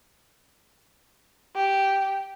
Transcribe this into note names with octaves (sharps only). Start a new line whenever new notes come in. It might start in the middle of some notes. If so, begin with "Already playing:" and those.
G4